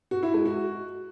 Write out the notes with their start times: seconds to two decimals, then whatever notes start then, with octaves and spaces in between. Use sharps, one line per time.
0.11 F#4
0.23 E4
0.34 G#3
0.45 F#4